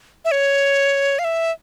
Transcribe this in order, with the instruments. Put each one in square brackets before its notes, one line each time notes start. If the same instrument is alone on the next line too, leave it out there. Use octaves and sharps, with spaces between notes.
[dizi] E5
C#5
F5
E5